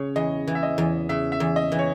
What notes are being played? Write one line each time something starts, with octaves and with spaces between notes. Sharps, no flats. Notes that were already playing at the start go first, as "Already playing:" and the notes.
Already playing: C#3 C#5
E2 D#5
E3
E5
D#5
E2
C#3 E5
E5
E2
D#5
E3
C#5